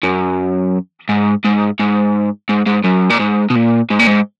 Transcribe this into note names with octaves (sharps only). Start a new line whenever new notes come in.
F#2
G#2
G#2
G#2
G#2
G#2
F#2
A#2
G#2
B2
A#2
G#2
A#2
G#2